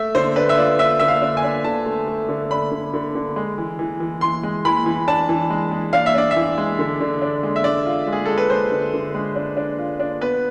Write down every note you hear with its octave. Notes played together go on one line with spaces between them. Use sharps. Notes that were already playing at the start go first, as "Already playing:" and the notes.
Already playing: A3 E5
D3 C5
D4 B4
E5
F4 D5
D4 E5
D3 E5
F5
D4
G#5
D4
D3 A5
A3
A3
D3
D4 B5
D3
D3
D3
G#3
E3
E3
E3
E3 C6
G#3
E3 B5
E3
D4 A5
E3
G#3
G#3
D4 F5
E5
D4 D5
E5
E3
G#3
D3
D3
D4
G#3
E5
D4 D5
F4
G#3
G#4
G#3 A4
B4
G#3 C5
D3
D3
G#3
D4
D4
F4
D4
B3 B4